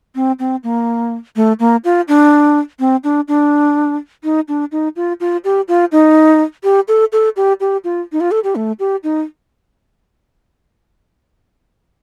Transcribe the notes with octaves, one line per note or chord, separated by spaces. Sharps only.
C4
C4
A#3
A3
A#3
F4
D4
C4
D4
D4
D#4
D4
D#4
F4
F4
G4
F4
D#4
G4
A4
A4
G4
G4
F4
D#4
F4
A4
G4
A3
G4
D#4